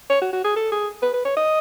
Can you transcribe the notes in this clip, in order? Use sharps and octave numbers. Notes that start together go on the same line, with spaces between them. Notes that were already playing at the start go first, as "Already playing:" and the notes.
C#5
F#4
F#4
G#4
A4
G#4
B4
B4
C#5
D#5